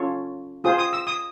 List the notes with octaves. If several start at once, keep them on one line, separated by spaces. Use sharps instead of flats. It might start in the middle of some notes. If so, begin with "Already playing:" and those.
Already playing: C#4 F4 A4 C#5
F4 G#4 C5 D#6
D#6
E6
D#6